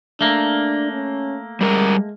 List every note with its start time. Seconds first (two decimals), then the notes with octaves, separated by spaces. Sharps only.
0.21 A3 A#3 D4
0.92 C#4
1.61 G3 G#3 A#4